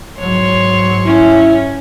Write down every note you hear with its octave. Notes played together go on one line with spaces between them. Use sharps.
G#2 F#3 C#5 C6
C#4 E4